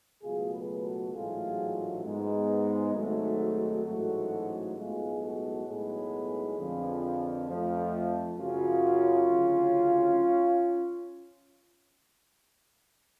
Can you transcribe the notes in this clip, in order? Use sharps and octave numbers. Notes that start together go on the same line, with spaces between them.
C#2 B2 F#3 A3 F4 G#4
G#4 B4
F#4 A4
A1 G#2 F#3 A3 F4 G#4
G#2 G#3 B3
G#1 G#2 F#3 A3
A1 G#2 F#3 A3 F#4 A4
B1 A2 G#3 B3 F4 G#4
F#4 A4
B1 A2 G#3 B3 G#4 B4
F2 D3 F3
F2 F3 A3
F#2 C#3 F#3 C#4 F4
D2 C#3 F#3